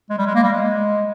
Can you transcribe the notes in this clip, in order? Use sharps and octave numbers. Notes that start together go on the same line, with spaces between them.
G#3
G3
G#3
A#3
G3
G#3